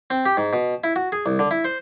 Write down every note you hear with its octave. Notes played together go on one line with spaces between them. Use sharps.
C4
G4
G#2
B2
E4
F#4
G#4
C2
D3
E4
C5